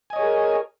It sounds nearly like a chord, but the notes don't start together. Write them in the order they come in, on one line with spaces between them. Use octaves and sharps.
G#5 D#5 C#5 G#4 A#4